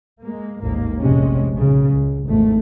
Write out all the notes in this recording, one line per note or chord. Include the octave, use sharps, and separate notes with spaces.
G#3 A#3
A1 D#2 G#2 A#3
F1 A#1 C3 G#3 C#4
B1 C#3
C#2
G#1 E2 A3